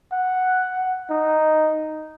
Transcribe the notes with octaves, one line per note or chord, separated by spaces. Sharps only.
F#5
D#4